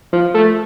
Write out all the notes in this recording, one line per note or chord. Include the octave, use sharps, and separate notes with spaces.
F3
A3